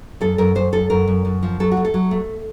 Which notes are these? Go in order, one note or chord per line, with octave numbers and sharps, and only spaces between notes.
F#2 A4
F#2 A#4
F#2 C5
F#2 A4
F#2 A#4
F#2
F#2
F3
F#3 A4
F#4
A3
A4
F#3
A3